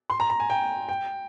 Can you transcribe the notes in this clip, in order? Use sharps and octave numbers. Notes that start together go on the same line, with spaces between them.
C6
A#5
A#5
G#5
G5
G5